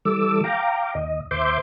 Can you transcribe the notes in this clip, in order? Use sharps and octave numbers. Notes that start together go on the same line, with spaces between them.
E3 G3 A4 D6 E6
F5 G5 A#5 D6
D#2 D#5
D#2 C5 E5 C6 D6 G6